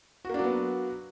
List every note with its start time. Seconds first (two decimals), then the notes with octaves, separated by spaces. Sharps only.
0.25 F#4
0.29 A#3
0.34 D4
0.39 F#3
0.44 B3